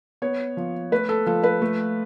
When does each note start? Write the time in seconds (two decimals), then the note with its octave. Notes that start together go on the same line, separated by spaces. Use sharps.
0.22 B3 C#5
0.57 F3
0.92 A3 B4
1.09 A4
1.26 F3 A4
1.44 B4
1.62 A3